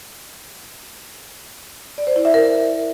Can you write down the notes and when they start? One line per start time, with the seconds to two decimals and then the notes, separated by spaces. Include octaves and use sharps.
1.98 D5
2.07 C5
2.16 E4
2.25 E5
2.34 A#4